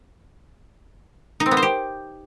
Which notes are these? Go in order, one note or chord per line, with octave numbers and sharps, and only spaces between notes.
D#4
C4
B3
C5
G4